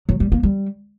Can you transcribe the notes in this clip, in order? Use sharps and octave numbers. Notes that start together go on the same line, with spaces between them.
F#3
G3
A#3
G3